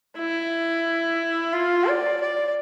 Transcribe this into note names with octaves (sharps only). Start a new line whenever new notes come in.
E4
F4
D5
D5